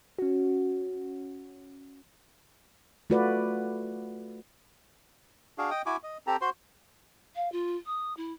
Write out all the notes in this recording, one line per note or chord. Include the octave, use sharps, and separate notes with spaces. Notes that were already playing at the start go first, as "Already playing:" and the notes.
C#4 F#4
A3 F4 F#4 B4 D5
D4 F#4 G#4 F5
D#5 G5 D#6
E4 F#4 G#5 D6
D#5
C4 G4 A4 A#5
F#4 C5 C6
F5
F4
D#6
E4